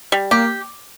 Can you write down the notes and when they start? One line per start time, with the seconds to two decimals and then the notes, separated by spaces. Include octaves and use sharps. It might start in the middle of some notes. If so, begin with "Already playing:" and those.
0.12 G3
0.31 A#3 G4